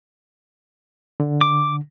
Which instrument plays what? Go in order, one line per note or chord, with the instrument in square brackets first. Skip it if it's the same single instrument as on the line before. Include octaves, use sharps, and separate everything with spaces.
[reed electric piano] D3
[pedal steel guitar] D6